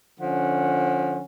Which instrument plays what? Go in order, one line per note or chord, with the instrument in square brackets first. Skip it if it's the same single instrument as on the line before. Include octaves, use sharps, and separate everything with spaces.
[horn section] D3 F3 C#4 F#5